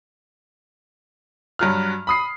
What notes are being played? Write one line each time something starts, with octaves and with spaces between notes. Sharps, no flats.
G2 F#3 F6
B5 D#6 C7